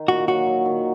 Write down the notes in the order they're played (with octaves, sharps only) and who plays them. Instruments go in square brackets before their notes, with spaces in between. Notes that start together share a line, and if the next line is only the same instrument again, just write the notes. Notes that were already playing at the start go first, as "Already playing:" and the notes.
Already playing: [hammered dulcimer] D#3
[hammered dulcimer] A#2 [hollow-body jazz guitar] F#4
[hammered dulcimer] F#3 [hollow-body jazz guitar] F#4
[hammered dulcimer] F#3
D#3